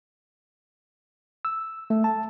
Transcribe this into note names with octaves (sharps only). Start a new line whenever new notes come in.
E6
A3
A5